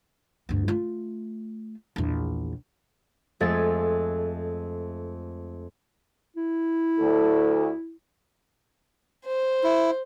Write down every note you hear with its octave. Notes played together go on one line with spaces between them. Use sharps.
D2 G2
A3 F4
A#1 E2
F2 G#3 A3 A6
E4
D2 A4
C5
E4